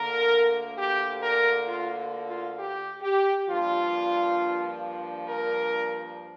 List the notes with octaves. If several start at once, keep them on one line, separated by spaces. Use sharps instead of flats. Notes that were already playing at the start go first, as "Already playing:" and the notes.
Already playing: D2 D3 A#3 D4 A#4
G4
A#4
F4
F4
G4
G4
G2 F3 A#3 D4 F4
A#4